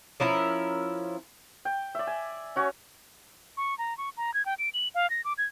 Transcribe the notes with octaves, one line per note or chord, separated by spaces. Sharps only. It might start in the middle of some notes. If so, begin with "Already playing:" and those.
F3 C#4 E4 A#4
G5
D5 E5
G#5
C#4 F#4 C#5 G#5
C#6
A#5
C#6
A#5
G#6
G5
D7
F#7
F5
A#6
D6
G#6